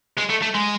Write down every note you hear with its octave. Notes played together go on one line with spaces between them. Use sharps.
G#3
A3
A3
G#3